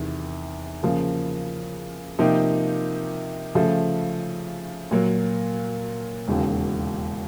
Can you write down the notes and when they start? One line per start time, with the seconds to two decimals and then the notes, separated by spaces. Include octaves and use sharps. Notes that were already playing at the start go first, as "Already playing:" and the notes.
Already playing: E2 C3 D#3
0.83 C#3 F3 A#3
2.19 C3 F3 A#3 D#4 G4
3.55 C#3 F3 A3
4.91 A#2 F#3 A#3
6.28 E1 D#2 C#3